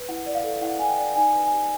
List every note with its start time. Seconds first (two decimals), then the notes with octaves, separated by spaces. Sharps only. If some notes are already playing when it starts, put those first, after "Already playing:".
Already playing: B4
0.09 E4 F#5
0.26 D5
0.35 F5
0.44 A4
0.61 E4 F#5
0.79 E4 G#5
0.89 G5
0.98 D5
1.15 D#4 G#5
1.33 B4
1.42 G#5
1.51 G4